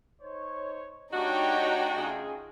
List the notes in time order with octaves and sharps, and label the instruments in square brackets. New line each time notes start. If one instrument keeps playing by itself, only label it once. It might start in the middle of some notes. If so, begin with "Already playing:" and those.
[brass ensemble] D#4 C5 C#5
[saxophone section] A3 D4 F#4 [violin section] D#4 G5 [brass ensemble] G4 C#5
[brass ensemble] C#3 F4 G#4